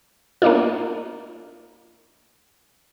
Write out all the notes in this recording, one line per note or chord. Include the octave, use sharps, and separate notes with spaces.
A#3 B3 D4 D#4 F4